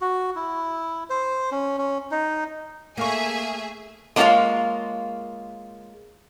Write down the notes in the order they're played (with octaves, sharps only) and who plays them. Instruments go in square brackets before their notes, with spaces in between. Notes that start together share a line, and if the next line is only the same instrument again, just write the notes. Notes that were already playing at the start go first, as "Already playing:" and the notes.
[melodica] F#4
E4
C5
C#4
C#4
D#4
[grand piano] A3 F5 C#6 [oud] A#3 A#4 [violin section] G#4 E5 G#5
[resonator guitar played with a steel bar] G#3 A#3 D4 F4 C#5 F5